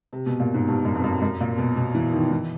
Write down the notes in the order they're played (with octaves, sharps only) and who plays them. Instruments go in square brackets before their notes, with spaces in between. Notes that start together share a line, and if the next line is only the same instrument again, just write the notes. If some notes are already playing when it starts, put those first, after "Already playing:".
[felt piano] C3
B2
A#2
G#2
G2
F#2
F2
F#2
F#2
A#2
B2
B2
E3
D#3
E3